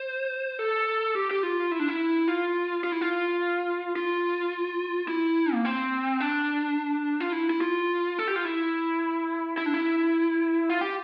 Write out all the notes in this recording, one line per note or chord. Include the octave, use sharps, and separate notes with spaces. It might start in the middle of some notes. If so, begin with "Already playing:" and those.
Already playing: C5
A4
G4
G4
F4
E4
D4
E4
F4
F4
E4
F4
F4
E4
A#3
C4
D4
F4
E4
E4
F4
A4
G4
F4
E4
E4
D4
E4
F4
G4